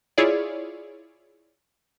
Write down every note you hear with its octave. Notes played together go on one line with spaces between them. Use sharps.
E4 F4 G#4 C#5 D5